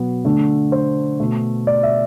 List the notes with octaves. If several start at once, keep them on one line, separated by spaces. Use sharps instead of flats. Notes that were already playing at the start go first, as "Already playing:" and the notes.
Already playing: B2 F#3 B3
D3 A3
C5
B2 A3
D5
E5